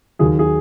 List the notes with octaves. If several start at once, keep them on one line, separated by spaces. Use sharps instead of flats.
D#2 D#3 F#3 G#4
G#4